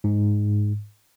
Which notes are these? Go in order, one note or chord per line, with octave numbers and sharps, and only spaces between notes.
G#2